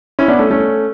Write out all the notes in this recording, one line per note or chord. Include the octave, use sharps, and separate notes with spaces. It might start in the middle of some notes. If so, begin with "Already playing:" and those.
C#4 E4
B3 D4
A3 C#4
A3 C#4